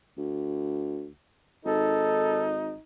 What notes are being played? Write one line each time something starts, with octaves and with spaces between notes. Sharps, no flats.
D2
G#1 D#4 A4